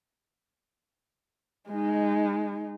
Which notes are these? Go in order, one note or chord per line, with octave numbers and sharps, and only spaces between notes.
G#3 D#4